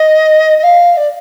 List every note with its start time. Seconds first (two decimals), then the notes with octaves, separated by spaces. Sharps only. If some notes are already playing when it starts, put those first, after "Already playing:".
Already playing: D#5
0.58 D#5
0.63 F5
0.97 D5